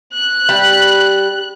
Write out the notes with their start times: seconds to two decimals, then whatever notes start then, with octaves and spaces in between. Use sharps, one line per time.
0.13 F#6
0.49 G3